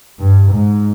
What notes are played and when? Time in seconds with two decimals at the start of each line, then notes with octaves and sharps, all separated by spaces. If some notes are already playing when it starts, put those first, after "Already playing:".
0.20 G2
0.51 G#2